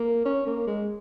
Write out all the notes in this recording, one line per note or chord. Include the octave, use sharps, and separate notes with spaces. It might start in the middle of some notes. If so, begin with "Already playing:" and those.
Already playing: A#3
C#4
A#3
G#3